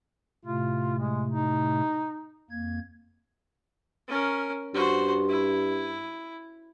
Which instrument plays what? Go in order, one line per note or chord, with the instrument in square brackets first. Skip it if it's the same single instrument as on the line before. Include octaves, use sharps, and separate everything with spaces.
[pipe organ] A2 C3 A3 [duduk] F4
[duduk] G#3
D#4
[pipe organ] F2 A#3 G#6
[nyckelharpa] C#4 A#4
[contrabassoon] G2 [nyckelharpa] F#4 C5
[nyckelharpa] E4